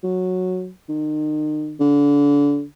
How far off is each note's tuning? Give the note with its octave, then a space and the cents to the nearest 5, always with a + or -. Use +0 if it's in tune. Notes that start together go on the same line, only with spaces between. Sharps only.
F#3 -10
D#3 -35
D3 -30